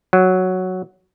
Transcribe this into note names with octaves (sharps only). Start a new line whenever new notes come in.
F#3